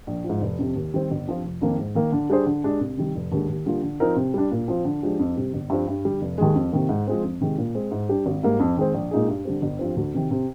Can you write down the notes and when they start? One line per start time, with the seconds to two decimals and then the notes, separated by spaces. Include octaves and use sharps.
0.07 A#1
0.24 F3
0.30 G#2
0.42 F1
0.58 F2 C3
0.76 D#2
0.94 D#3 G3 C4
1.11 G1
1.27 G2 F3 C4 F4
1.44 F1
1.61 F2 D#3 A#3
1.79 G#2
1.95 D#3 A#3
2.12 D3
2.30 G3 D4 G#4 C5
2.46 D3
2.64 G#3 D4 G4
2.81 C2
2.97 C3 D#3 G3
3.15 F1
3.32 D#2 D3 G#3
3.49 D#2
3.66 D3 G3 A#3 F4
3.82 D3
4.00 F3 C4 D#4 A#4
4.16 C3
4.34 G3 D4
4.51 A#2
4.68 F3 C4 F4
4.85 D3
5.03 F3 G#3 D4 G4
5.20 F2
5.36 C3 G3 C4
5.54 G1
5.70 G2 F3 C4 G4
5.88 G2
6.05 D3 G3
6.22 F1
6.38 D#2 D#3 G#3
6.55 F2
6.72 C3 D#3 A#3
6.89 G#2
7.07 F3 G#3 C4
7.24 F2
7.41 C3 D#3 G#3
7.58 A#2
7.75 G#3 C4
7.91 G#2
8.09 G3 D4 G4
8.26 G#1
8.43 G#2 G3 A#3
8.60 F2
8.77 D#3 G#3 C4
8.94 A#1
9.11 A#2 G#3 D#4 G#4
9.28 G2
9.45 D3 G3 C4
9.62 G1
9.79 G2 F3 C4
9.97 D2
10.14 C3 D#3
10.31 C3